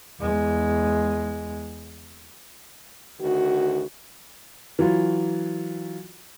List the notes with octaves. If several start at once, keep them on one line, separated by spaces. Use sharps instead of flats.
E2 G#3
D2 D#3 F#4
E3 F#3 F4